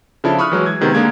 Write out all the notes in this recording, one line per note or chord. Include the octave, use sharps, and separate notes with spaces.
C#3 F3 D4 E4 A4
B5 C#6 D#6 F6 F#6
E3 F#3 G#3
G#6
C3 D#3 G#3 B3
D3 G#3 A#3 G#6